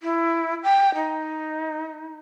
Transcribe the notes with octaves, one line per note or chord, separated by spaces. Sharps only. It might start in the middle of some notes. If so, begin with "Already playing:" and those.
E4
G5
D#4